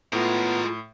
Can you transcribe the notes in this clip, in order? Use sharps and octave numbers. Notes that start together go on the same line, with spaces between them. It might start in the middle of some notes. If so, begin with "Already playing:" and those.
A2 G#3 B3 F4 A#4